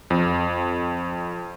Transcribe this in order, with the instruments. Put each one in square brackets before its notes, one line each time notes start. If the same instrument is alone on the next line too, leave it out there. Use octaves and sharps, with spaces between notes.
[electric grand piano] F2